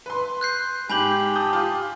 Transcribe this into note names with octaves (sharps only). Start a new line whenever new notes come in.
B4 C6
F#6 G6 C7
G#2 G4 G#5 B5 G6 F#7
A5 D#6 G6
F4